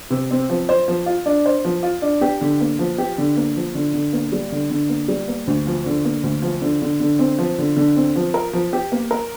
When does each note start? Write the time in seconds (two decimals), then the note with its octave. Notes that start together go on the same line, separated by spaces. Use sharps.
0.10 C3
0.31 C4
0.50 F3
0.69 C5
0.88 F3
1.06 F4
1.26 D4
1.46 C5
1.65 F3
1.83 F4
2.02 D4
2.21 G4
2.41 D3
2.61 A#3
2.79 F3
2.98 G4
3.18 D3
3.37 A#3
3.56 F3
3.75 D3
3.94 D3
4.13 A#3
4.32 G3
4.52 D3
4.70 D3
4.89 A#3
5.08 G3
5.28 A#3
5.47 D2
5.67 F3
5.86 D3
6.05 A#3
6.23 D2
6.42 F3
6.62 D3
6.82 D3
7.00 D3
7.19 C4
7.39 F3
7.58 D3
7.76 D3
7.96 C4
8.16 F3
8.34 A#4
8.53 F3
8.73 G4
8.92 A#3
9.11 A#4